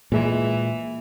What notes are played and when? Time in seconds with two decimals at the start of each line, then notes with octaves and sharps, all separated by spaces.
0.12 A#2 E3 G#3